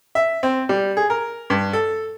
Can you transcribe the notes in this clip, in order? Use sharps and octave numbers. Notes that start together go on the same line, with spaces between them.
E5
C4
G3
G#4
A#4
G2
A4